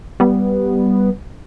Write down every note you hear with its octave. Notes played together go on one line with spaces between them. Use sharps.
G3 B3